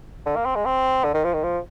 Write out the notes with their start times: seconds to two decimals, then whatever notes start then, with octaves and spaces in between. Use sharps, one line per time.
0.26 D3
0.36 A#3
0.45 C4
0.55 G#3
0.65 C4
1.04 D3
1.14 D#3
1.24 F3
1.34 D#3
1.43 F3